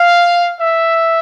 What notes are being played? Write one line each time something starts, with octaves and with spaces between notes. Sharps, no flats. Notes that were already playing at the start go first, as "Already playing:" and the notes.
Already playing: F5
E5